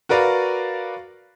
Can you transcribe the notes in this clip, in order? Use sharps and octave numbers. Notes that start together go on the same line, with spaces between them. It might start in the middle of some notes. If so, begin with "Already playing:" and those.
F#4 A#4 B4 D5 F5